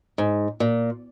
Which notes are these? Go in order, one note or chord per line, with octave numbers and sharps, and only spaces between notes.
G#2
A#2